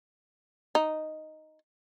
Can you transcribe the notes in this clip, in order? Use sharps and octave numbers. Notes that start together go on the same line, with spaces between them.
D#4